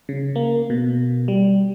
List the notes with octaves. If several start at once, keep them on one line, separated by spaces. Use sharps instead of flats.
C#3
A#3
B2
G3